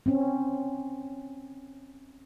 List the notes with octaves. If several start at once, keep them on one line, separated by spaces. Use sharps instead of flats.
C4 C#4